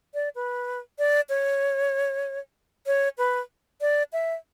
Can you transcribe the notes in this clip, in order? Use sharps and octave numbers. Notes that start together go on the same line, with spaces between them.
D5
B4
D5
C#5
C#5
B4
D5
E5